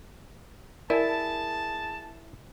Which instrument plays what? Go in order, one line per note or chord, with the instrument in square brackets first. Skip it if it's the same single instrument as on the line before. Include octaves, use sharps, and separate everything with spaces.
[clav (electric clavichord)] E4 [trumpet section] G#4 A5 [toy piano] A#4 D5 G#5